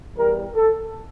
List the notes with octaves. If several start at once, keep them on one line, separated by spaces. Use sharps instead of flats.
E2 E3 G3 A#4
A4